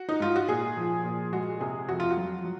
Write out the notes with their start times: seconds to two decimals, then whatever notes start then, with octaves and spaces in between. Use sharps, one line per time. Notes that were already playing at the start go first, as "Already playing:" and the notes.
Already playing: F#4
0.09 D#4
0.20 G#2 F4
0.36 F#4
0.48 A#2 G#4
0.77 F3
1.04 A#2
1.33 G#3 F#4
1.61 C3 G#4
1.89 F2 F#4
2.00 F4
2.10 F#4
2.17 F#3
2.45 F#3